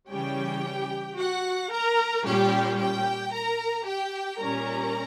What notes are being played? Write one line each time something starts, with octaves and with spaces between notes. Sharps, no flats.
C#3 E3 G3 C#4 G4 G5
F#4 F#5
A#4 A#5
A#2 G3 C#4 G4 G5
G4 G5
A#4 A#5
G4 G5
A#2 G3 C#4 A#4 A#5